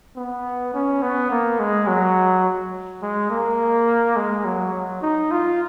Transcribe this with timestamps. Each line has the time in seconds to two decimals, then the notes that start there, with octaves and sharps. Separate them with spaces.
0.16 B3
0.74 C#4
1.02 B3
1.31 A#3
1.60 G#3
1.87 F#3
3.02 G#3
3.30 A#3
4.16 G#3
4.45 F#3
4.73 F#3
5.02 D#4
5.31 F4